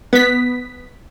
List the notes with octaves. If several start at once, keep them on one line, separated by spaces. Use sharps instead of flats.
B3 B6